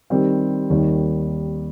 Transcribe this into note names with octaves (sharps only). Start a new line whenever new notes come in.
D#3 G3 C4
D#2 D#3 G3